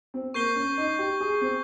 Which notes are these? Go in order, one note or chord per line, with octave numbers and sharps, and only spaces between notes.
C4
A#3 C#6 G6 C7 G7
C#4
D#4
G4
G#4
C4